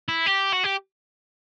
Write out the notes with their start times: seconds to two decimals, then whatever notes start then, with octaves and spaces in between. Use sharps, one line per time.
0.08 E4
0.26 G4
0.53 F#4
0.64 G4